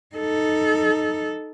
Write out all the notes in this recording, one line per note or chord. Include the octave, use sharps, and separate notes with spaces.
D#4 A4